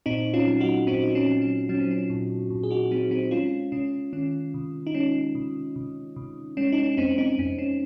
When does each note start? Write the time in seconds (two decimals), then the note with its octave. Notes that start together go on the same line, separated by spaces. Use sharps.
0.06 A#2 C4 D#4
0.34 C#4 F4
0.47 F#3
0.60 D#4 F#4
0.87 A#2 C4 D#4
1.04 D#4
1.15 C#4
1.28 F#3
1.42 C#4
1.69 F#3 C#4
1.80 C4
1.91 C#4
2.10 A#2
2.50 A#2
2.63 G#4
2.70 D#4 F#4
2.91 F#3 C4 D#4
3.11 C4 D#4
3.31 G#3 C#4 F4
3.72 C3 C#4
4.13 D#3 C#4
4.54 C3
4.87 D#4
4.94 G#3 C#4
5.35 C3
5.76 C3
6.16 C3
6.57 G#3 C#4
6.72 D#4
6.78 C#4
6.97 F2 C4 D#4
7.18 C4 D#4
7.38 F2 C4
7.58 C#4